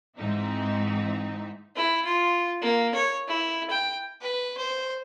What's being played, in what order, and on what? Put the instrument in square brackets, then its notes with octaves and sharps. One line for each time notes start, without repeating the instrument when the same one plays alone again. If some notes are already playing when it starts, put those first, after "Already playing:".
[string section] G#2 E3 C4 D#4 E5
[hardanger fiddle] E4
F4
A#3
C#5
E4
G5
[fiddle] B4
C5